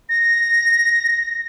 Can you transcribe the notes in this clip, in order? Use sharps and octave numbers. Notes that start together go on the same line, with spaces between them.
A#6